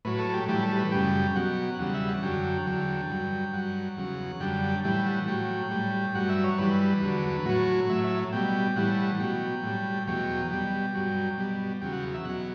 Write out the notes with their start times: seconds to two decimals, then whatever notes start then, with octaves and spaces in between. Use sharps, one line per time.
0.05 A2 F#3 B4
0.19 A4
0.34 G4
0.48 A2 E3 G3 G4
0.63 A4
0.77 B4
0.92 F#2 C#3 G3 G5
1.35 B2 F#3 F#5
1.79 E2 C#3 G3 F#5
1.94 E5
2.08 F#5
2.23 F#2 D3 F#3 G5
2.66 E2 D3 F#3
3.10 G2 F#3
3.53 G2 F#3 F#5
3.97 E2 C#3 F#3
4.40 F#2 D3 G3 G5
4.84 A2 E3 G3 G5
5.06 F#5
5.28 A2 F#3 G5
5.71 A2 G3
6.15 G2 F#3 F#5
6.29 E5
6.44 C#5
6.58 G2 E3 G3 B4
7.02 E2 D3 F#3
7.45 A2 F#3 F#4
7.89 A2 F#3 E5
8.04 E5
8.33 B2 G3 G5
8.76 A2 E3 G3 F#5
9.20 B2 F#3 G5
9.63 A2 G3
10.07 E2 B2 F#3 G5
10.51 B2 G3 G5
10.95 G2 F#3
11.38 B2 G3
11.81 E2 C#3 F#3 G5
11.93 F#5
12.14 E5
12.25 B2 F#3 F#5